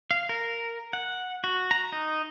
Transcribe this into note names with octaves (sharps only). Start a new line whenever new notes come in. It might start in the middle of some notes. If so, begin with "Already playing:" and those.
F5
A#4
F#5
F#4
A#5
D#4